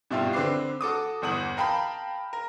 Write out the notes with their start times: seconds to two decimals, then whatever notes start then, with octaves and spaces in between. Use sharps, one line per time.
0.10 G2 B2 E4 F4 G4
0.33 D3 C4 B4 D6 C7
0.81 F#4 A4 D6 D#6
1.22 G1 E2 D#6 F#7
1.57 A#4 F5 G5 A5 B5
2.33 A#4